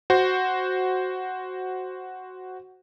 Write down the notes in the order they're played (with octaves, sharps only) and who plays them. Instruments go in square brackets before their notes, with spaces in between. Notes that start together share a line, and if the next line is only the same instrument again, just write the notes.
[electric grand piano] F#4 C5